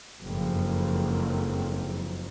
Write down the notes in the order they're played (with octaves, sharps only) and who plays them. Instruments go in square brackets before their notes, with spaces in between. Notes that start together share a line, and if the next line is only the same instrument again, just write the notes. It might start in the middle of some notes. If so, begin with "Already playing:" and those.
[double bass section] F#1 F2 G#2